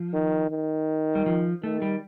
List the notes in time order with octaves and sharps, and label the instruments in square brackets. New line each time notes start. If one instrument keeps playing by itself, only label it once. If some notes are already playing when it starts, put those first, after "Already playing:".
Already playing: [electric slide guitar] F3
[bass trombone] D#3
D#3
[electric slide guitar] G3
F3
[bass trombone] D#3 [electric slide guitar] A3
[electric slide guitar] G3